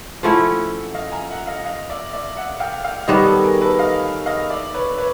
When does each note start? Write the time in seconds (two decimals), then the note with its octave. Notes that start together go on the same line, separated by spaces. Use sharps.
0.23 F3 A3 C#4 E4 E5 F#5
0.94 D#5 F5
1.12 G#5 A#5
1.30 E5 F#5
1.47 D#5 F5
1.66 D#5 F5
1.89 D5 E5
2.13 D5 E5
2.37 E5 F#5
2.60 F5 G5
2.84 F5 G5
3.07 D#3 G3 B3 C#5 D#5
3.25 A4 B4
3.44 G#4 A#4
3.61 A4 B4
3.79 D#5 F5
4.26 D#5 F5
4.50 D5 E5
4.74 B4 C#5
4.98 B4 C#5